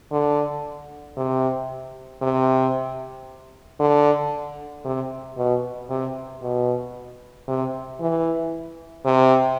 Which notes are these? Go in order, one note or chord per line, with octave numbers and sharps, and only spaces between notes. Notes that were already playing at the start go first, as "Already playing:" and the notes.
D3
C3
C3
D3
C3
B2
C3
B2
C3
E3
C3